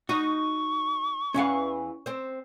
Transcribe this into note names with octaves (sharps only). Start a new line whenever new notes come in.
D#4 F#4 C#6
E2 E3 C#4 F5 F#5
C4 C5